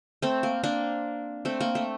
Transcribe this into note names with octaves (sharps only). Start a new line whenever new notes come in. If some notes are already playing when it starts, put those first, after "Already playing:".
A3 C4
A#3
A#3 D4
A3 C4
A#3
A3